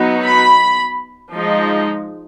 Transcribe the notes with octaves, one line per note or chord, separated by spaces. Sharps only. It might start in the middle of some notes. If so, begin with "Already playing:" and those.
Already playing: F#3 B3 D#4
B5
F3 G#3 D#4